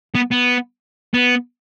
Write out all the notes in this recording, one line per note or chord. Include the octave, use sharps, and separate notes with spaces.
B3
B3
B3